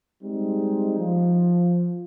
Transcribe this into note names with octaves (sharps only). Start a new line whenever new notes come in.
G3 G#3 C4 D#4
F3